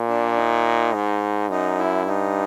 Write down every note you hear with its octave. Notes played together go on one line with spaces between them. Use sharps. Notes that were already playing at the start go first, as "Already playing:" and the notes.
Already playing: A#2
D4
D#4
G#2
F#2 D#4
E4
G2 D#4